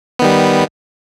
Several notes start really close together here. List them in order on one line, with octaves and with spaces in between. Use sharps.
B3 D#3 G3